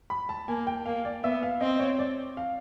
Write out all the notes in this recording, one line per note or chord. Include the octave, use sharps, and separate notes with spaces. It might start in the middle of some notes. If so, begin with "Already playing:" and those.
B5
A5
A#3 G#5
G5
A#3 F5
D5
B3 E5
F5
C4 D#5
C#5
D5
F5